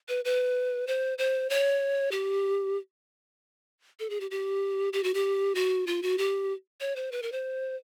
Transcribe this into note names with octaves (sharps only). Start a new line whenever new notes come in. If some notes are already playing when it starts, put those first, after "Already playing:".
B4
B4
C5
C5
C#5
G4
A4
G#4
G4
G4
G4
F#4
G4
F#4
F4
F#4
G4
C#5
C5
B4
A#4
C5